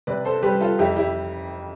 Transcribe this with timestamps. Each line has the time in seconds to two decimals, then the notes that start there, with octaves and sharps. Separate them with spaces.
0.07 C3 B4 D5
0.25 A4 C5
0.43 G3 G4 B4
0.61 F4 A4
0.79 F2 E4 G4
0.96 E4 G4